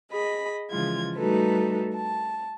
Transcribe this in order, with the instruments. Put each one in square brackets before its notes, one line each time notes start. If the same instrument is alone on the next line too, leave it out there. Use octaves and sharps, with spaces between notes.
[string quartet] G#4 D#5 B5
C#3 E3 F3 G#3 F4 G#6
G3 A3 D#4 F#4 A4 B4
A5